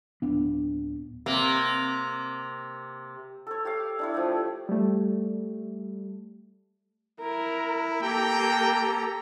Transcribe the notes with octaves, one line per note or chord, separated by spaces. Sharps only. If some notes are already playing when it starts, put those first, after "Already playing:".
D1 B3 D4
C3 A#3
A4 C#5
G4 C#5 F5
D4 E4 C#5
F3 A3
G3 A3
E4 A#4
A#3 G4 A4 G5 A#5